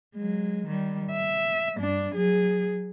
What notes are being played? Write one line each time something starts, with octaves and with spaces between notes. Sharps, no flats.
F#3 G#3
D#3 G3
E5
G2 D4
F#3 G#4